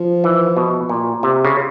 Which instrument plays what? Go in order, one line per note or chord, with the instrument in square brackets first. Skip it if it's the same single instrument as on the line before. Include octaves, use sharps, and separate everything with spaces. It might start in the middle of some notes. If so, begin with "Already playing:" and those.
Already playing: [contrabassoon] F3
[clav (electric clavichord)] E3
B2
A#2
C3
C#3